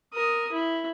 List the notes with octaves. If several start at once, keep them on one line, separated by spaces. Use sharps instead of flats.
A#4 D#6
E4